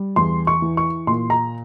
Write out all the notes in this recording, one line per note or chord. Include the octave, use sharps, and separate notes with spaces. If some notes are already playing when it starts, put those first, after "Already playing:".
Already playing: G3
E2 C6
C#6
E3
C#6
A#2 C6
A#5